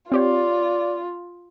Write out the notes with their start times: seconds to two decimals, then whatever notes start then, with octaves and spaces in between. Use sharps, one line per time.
0.12 C4 F4 G4 C#5 D5